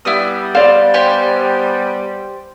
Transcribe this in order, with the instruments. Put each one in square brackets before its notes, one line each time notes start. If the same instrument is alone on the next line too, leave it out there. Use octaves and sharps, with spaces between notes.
[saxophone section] G3 B3 [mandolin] E4 D#6
[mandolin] C5 [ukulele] D5 F5
[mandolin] G4 C5 G#5